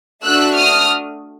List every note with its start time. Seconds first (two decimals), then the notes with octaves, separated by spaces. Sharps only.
0.24 A3 D4 F#4 E6 F#6
0.55 D#6 F6